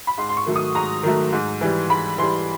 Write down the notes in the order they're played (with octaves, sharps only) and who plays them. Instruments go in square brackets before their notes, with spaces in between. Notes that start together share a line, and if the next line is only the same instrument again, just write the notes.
[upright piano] B5
G#2 C6
C6
C#6
D#3 F#3 A3
D#6
G#2 A#5
D#3 F#3 A3
G#2
E3 G3
G#2 B5
E3 G3 C6